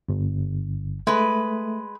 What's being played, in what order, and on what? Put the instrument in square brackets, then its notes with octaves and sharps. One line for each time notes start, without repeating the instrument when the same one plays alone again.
[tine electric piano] G1
[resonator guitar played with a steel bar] G#3 B4 [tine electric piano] A3